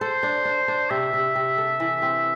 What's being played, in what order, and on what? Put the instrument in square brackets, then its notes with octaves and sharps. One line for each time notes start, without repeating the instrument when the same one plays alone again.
[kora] A4 [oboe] C5
[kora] D4
D4
D4
[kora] C3 [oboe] E5
[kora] C3
C3
A4
E3
C4